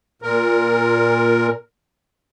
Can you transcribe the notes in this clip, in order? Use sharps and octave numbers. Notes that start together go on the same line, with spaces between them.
A#2 A#4